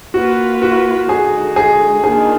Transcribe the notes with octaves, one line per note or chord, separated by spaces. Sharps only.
A#3 F4 F#4 B4
F#4
D3 G#3 D#4 G#4
G#4
D#3 A#3 D4 F4 G#4